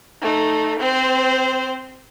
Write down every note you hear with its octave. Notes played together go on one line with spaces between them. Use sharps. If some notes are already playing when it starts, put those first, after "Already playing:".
A3 D#4
C4 C5